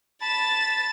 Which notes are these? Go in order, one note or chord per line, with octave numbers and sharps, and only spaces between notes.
A5 B5 A6 E7